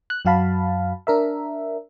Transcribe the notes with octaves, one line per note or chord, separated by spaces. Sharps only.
F#6
F#2 F#3 F#4 F5 A5 B5
D4 A#4 E5